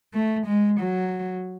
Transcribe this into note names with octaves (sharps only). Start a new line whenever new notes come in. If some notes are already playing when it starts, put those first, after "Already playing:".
A3
G#3
F#3